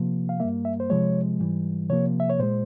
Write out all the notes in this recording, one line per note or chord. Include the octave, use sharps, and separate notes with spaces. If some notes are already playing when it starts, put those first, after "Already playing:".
Already playing: C3 F3 A#3
F5
G2 G3 A#3 E5
E5
C5
C3 F3 G#3 C#5
G#2 E3 G3
C3 F3 A#3 C#5
E5
C#5
A#2 G#3 C5